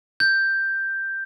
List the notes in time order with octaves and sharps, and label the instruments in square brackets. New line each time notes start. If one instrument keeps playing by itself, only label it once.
[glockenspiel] G6